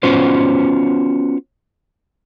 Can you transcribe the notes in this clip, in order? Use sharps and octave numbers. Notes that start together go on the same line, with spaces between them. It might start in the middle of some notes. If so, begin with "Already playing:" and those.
B3 C#4 F4 F#4 C5